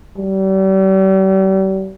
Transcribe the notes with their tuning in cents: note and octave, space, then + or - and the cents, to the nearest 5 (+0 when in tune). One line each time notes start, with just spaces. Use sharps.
G3 -40